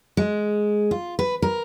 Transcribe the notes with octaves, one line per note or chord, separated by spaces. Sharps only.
G#3
F4
B4
A#4